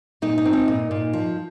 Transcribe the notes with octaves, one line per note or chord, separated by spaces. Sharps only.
A#2 D#4
D#4
C4
D#4
A#2
A#2
F3